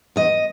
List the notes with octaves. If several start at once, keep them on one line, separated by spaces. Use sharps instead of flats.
E2 D#5